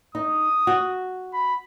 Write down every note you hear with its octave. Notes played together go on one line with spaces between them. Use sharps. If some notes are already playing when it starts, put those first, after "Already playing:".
D#4 D#6
F#4
B5